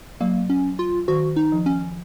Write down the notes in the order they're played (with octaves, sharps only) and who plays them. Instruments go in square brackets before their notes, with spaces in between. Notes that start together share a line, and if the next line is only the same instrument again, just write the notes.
[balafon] F#3 [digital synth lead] A#3
[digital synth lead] C#4
F4
[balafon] D#3 [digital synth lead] F#4
[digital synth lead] D#4
[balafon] F3
[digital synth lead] C#4